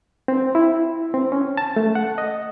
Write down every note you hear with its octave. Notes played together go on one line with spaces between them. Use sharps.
C4
E4
C4
C#4
A5
A3
F#5
D#5